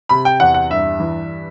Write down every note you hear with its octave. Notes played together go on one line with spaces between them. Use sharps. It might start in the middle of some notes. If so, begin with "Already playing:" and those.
C3 B5
G5
E2 F#5
F#5
G2 E5
E3